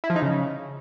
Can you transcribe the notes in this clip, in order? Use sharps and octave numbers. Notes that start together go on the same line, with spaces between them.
E4
F3
D#4
C#3